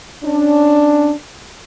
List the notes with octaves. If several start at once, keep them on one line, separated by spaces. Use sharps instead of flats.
C#4 D4